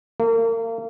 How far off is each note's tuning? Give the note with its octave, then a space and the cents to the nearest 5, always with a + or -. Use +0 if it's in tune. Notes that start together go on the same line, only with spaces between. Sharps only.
A#3 -35